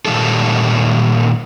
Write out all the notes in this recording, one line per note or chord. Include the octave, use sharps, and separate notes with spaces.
A#2 D#3 G3 A4